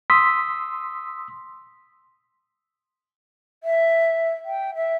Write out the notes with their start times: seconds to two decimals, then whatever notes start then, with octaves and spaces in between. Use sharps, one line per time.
0.10 C6 D#6 E6 B6
3.63 E5
4.45 G5
4.75 E5